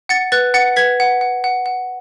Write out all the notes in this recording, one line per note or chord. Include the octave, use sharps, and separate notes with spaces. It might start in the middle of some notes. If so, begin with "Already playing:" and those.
F#5 A6 C#7
B4 F#6 A6
F#5 A6 C#7
B4 G#6 B6
F#5
F#5
F#5
F#5